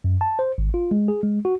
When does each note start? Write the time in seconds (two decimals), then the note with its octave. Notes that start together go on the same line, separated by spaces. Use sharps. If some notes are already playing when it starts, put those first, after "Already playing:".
0.04 F#2
0.21 A5
0.39 C5
0.58 G#1
0.74 F4
0.91 G#3
1.08 G#4
1.23 G#3
1.45 F#4